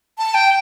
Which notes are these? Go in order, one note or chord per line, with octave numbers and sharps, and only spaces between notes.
A5
G5